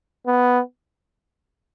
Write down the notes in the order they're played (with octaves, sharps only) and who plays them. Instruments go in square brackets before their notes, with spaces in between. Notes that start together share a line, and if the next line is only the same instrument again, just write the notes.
[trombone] B3